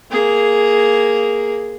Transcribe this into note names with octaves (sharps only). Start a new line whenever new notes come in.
A#3 G#4